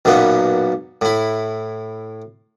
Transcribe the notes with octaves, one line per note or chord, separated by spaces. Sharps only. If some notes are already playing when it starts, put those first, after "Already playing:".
B1 F#2 A#2 B3
A2 E4